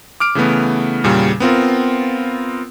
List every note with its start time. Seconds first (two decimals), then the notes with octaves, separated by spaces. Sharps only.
0.20 D6 F6 D7
0.35 C#3 E3 A3 B3
1.04 E2 A#2 C#3 G3
1.40 B3 C4 F4 A#4